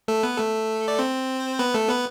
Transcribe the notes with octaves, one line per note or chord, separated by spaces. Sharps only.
A3 A4
B3 B4
A3 A4
D5
C4 C5
B3 B4
A3 A4
B3 B4